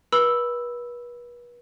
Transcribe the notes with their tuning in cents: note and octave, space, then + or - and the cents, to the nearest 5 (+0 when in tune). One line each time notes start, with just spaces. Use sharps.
B4 -35 B5 +0 E6 +0